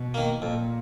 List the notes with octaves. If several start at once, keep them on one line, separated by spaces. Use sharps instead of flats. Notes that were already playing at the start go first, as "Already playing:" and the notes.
Already playing: B2
D#3 A#3
F2 A#2